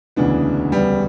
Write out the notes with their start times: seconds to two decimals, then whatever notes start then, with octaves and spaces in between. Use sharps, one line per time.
0.16 E1 D2 C#3 E3 B3 D4
0.72 G3 B3